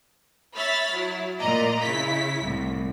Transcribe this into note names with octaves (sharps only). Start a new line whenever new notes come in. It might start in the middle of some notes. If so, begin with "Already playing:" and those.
C#5 E5 B5 F6 A6 B6
F#3 E4
A#2 D5 D#5 A#5
C#3 E4 B6
C2 A2